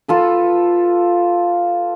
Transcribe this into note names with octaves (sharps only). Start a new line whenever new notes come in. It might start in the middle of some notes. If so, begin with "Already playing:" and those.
F4 A4 B4